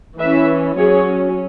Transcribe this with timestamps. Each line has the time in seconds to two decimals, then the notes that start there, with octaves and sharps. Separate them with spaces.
0.19 E3 C#4 B4 E5
0.77 F#3 C#4 G#4 C#5